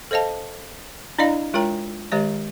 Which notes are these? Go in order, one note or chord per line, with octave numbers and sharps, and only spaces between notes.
A4 C5 D#5 F5 A5
D4 E4 D5 D#5 F5 A#5
G#3 F4 A#4 C#5 G5 A#5
D#3 G#3 G4 C#5 D#5